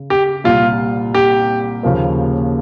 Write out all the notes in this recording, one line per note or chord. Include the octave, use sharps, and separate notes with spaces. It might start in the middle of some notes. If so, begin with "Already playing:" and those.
Already playing: C#3
G4
C2 A#2 G3 F4
G4
D#2 C#3 F3 A#3